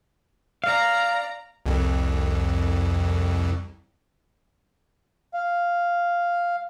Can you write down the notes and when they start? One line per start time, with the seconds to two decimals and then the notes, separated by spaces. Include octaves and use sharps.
0.64 D5 F5 A#5
1.66 C2 F2
5.34 F5